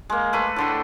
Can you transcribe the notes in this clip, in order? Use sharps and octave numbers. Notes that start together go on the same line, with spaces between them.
G#3 A#3
A3 B4 C6
A2 D3 C6